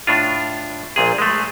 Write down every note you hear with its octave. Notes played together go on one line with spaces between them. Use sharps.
A2 D4 F4
A#1 A#2 G#4
G#3 A3